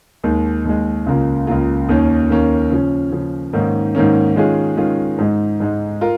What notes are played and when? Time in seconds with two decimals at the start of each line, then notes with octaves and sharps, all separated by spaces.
0.24 D#2 D#3 G#3
0.65 D#2 D#3 G#3
1.06 C#2 C#3 A#3 F4
1.47 C#2 C#3 A#3 F4
1.89 D#2 D#3 A#3 C#4
2.30 D#2 D#3 A#3 C#4
2.71 C#3 F3 C#4
3.12 C#3 F3 C#4
3.53 G#2 D#3 A#3 C#4
3.95 G#2 D#3 A#3 C#4
4.36 D#3 G#3 C#4 F4 G#4
4.77 D#3 G#3 C#4 F4 G#4
5.18 G#2 G#3 D#4
5.60 G#2 G#3 D#4
6.01 F4 A#4